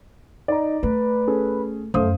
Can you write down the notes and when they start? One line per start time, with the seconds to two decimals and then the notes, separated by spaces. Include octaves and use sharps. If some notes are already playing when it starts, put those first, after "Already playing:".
0.48 D#4 D5 A#5
0.83 A3 B4
1.27 C#4 G#4 A4
1.94 F#2 A3 C5 F5 D#6